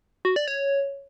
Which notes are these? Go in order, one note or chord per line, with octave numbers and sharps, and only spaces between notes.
F#4
D5
C#5